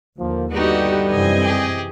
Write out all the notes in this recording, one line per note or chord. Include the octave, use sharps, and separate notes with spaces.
D#2 D3 F3 A#3
G2 D3 G3 B3 D#4 F#4 G4
F#2 C3 E3 C4 D#5 G#5
G4 G#4